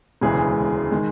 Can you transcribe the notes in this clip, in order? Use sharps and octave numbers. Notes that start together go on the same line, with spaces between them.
E1 D2 C#3 E3 G#3 G#4
D#3 G#3